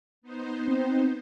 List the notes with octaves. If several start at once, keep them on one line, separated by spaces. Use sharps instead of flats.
B3 D#4 C5
C4